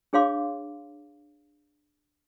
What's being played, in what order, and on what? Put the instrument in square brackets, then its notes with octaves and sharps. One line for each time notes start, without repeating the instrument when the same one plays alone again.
[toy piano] D4 G#4 C#5 F5 C6 D6